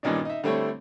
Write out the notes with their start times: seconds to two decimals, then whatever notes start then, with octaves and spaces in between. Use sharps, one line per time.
0.03 G2 A#2 D#3 C#4 D4
0.25 D#4 E5
0.44 D3 G3 A3 C4 E4 C#5